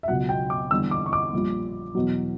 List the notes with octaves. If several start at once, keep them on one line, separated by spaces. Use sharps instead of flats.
E5
C#2 B2 F#3 F#5
G5
D6
E2 D3 G3 E6
D6
C#6
D6
A#1 A#2 G3
E2 B2 F#3